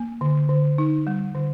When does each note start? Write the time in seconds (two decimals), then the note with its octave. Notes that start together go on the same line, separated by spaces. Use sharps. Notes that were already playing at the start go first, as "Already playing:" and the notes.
Already playing: A#3
0.21 D3
0.49 D3
0.78 D#4
1.07 G3
1.35 D3